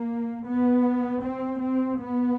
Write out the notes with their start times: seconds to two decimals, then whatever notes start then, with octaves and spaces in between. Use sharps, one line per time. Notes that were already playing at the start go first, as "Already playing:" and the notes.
Already playing: A#3
0.46 B3
1.22 C4
1.59 C4
1.98 B3